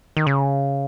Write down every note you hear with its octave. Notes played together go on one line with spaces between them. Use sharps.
D#3
C#3